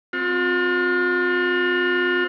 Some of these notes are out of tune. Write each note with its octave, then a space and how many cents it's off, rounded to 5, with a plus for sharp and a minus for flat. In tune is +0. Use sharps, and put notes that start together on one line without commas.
C4 +0 F4 +45